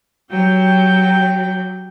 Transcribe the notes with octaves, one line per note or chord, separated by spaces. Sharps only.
F#3 G4 G5